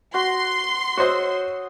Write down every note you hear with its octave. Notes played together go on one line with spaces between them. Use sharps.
F#4 C6
F#4 C5 C#5 D#6 E6